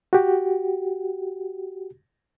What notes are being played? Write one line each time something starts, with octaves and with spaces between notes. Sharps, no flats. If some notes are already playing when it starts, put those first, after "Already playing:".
F#4 G4